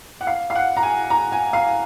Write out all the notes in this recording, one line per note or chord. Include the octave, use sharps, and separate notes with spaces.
F#5
F5
F5
F#5
A#5
G#5
A#5
G#5
F5